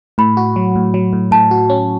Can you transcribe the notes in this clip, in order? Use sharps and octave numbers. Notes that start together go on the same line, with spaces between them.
A2 B5
F#4
F#3
A2
F#3
A2
A2 A5
F#4
C#4